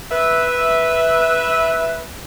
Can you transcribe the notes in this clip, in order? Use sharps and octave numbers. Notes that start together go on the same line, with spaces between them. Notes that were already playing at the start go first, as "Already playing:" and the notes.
B4 E5